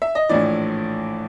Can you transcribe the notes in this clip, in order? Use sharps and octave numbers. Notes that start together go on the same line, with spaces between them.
E5
D#5
A#1 A2 E3 D5